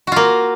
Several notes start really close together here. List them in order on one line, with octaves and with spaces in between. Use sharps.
F#4 F4 A#3